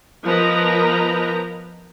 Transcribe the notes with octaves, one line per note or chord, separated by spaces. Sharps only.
F3 B3 A#4 B4 D#5 A#5